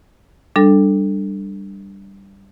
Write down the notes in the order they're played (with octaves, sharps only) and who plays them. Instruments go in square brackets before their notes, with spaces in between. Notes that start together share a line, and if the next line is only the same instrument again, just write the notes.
[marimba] G3 D4 A4